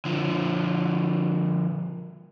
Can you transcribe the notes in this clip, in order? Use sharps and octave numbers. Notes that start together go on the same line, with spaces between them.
D3 F3